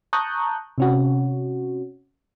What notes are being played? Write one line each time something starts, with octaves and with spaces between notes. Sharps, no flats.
A5 A#5 C#6 D#6 F#6 G6
C3 C#4 F#4